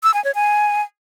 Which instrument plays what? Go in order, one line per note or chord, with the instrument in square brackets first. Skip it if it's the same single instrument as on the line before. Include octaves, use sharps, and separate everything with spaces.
[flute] E6
G#5
C#5
G#5